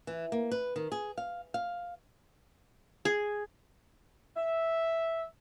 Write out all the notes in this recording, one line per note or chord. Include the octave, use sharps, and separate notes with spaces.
E3
A#3
B4
D#3
G#4
F5
F5
G#4
E5